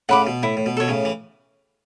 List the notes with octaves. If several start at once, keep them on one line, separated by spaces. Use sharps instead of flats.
A2 C#3 F#5 B5 D6
B2
A2 E4
A2
B2
B2 A4 C#5
A2 C#3
E3